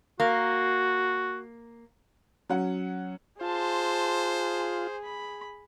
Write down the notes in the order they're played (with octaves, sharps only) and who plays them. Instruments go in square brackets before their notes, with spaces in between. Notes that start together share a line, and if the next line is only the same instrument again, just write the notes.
[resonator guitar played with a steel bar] A#3 [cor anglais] F#4
[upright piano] F#3 C#4 F#5
[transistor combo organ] F4 [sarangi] G#4 [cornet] C5 [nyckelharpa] A5 C6
[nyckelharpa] B5